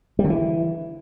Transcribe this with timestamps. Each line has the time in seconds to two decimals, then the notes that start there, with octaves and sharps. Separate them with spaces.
0.19 G3
0.24 D3
0.30 E3